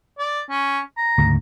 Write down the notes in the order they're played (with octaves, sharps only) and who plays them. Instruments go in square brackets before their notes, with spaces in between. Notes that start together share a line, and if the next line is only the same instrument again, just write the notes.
[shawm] D5
C#4
A#5
[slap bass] D2 G#2 C#3